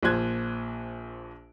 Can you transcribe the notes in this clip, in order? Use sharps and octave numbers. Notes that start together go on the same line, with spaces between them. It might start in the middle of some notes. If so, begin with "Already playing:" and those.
A#1 A#2 F3 C5 F#6 G#6